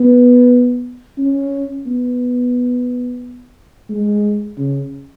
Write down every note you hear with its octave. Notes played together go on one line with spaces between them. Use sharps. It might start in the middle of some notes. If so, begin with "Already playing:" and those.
Already playing: B3
C#4
B3
G#3
C#3